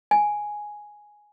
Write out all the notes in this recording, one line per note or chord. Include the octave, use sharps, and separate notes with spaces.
G#5